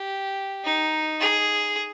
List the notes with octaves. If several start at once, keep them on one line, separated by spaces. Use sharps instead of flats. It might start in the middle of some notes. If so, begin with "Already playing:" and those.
Already playing: G4
D#4
G#4